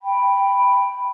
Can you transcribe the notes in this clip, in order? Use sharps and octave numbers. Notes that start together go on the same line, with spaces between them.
G5 B5